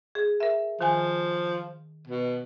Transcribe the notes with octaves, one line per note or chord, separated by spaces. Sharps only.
G#4
A#4 E5
D#3 F3 G#5
B2